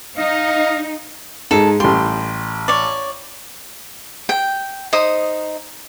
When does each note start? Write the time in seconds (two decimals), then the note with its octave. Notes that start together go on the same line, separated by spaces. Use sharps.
0.18 D#4 D#5 F5
1.51 G#2 G#3 A4
1.80 A1 G3 G5 C6
2.68 C#5 D5
4.29 G5
4.93 D#4 C5 D#6